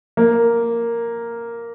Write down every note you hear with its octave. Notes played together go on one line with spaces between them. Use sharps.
A#3